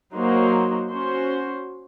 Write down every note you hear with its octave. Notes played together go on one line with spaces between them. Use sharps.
F#3 A#3 D#4 F#4 C5
C#4 F#4 C5